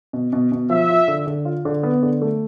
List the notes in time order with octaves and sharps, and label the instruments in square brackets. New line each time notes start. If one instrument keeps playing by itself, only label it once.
[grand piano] B2
B2
B2
[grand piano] F3 [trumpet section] E5
[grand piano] F4
D3
D3
F4
D3
B3
D3
A3